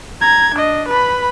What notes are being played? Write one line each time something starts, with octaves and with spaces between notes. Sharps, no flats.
A#5 G#6
D4 D#5
B4 B5